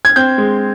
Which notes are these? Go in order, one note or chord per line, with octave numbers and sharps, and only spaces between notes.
G#6
C4 G6
G#3